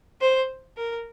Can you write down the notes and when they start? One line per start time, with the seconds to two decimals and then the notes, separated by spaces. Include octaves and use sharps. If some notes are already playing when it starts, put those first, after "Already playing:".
0.21 C5
0.77 A#4